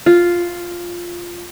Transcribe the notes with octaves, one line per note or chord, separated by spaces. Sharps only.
F4